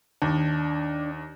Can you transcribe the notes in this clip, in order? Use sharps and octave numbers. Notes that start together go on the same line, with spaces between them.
D#2 D4